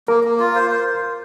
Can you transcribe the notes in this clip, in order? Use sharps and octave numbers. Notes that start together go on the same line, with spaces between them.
A#3 A#4
A#3
F4
C5
C5